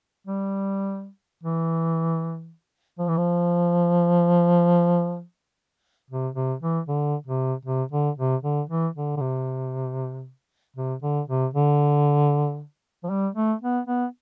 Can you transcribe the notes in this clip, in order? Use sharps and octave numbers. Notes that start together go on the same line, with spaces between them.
G3
E3
F3
E3
F3
C3
C3
E3
D3
C3
C3
D3
C3
D3
E3
D3
D3
C3
C3
D3
C3
D3
F3
G3
A3
B3
B3